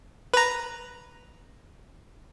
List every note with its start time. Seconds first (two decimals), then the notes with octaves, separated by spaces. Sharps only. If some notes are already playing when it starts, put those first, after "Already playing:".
0.34 B4 A#5